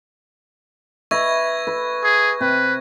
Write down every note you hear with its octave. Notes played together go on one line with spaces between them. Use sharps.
B4 E5 C#6 G#6 A#6
B4
G#4
C3 B4